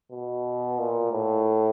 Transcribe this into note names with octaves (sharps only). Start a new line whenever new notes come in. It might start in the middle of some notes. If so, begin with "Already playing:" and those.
B2
A#2
A2